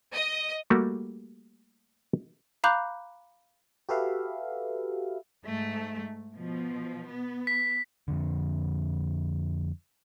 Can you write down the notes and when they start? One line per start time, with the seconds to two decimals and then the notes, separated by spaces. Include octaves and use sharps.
0.13 D#5
0.70 G3 A3 A#3 F#4 G4
2.64 F5 A#5 B5 D6 F#6 G6
3.89 F#4 G4 A4 B4 E5 F5
5.44 G#2 A3
6.35 B2 F3
7.11 B3
7.47 B6
8.08 F2 D3